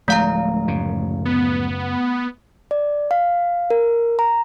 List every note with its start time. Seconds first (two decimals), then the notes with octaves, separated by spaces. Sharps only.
0.08 D1 F3 G#3 A3 F5 A#5
0.68 F#2 C#3
1.25 B3
2.71 D5
3.11 F5
3.70 A#4
4.19 A#5